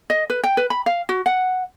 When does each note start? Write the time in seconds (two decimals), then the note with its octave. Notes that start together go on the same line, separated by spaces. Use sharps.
0.10 D#5
0.30 B4
0.44 G5
0.57 B4
0.70 B5
0.86 F5
1.09 F#4
1.26 F#5